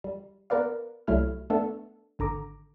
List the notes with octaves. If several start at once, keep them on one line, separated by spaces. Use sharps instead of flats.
G3
B3 A#4 B4 D5 F5
C2 F#3 G3 A3 E4 F6
A3 B3 D4 A4
G#1 D3 A#5 D6